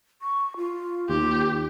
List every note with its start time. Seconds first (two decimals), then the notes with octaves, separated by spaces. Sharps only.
0.22 C#6
0.57 F4
1.09 D#2 G4